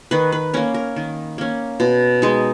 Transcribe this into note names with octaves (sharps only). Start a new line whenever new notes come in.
D#3 B4
B4
A#3 C#4 A#4
A#4
D#3
A#3 C#4
B2
G#3 D#4